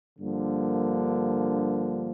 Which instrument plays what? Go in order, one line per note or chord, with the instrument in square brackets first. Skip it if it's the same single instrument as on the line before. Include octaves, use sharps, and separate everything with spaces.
[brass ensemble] G2 D3 F3 A#3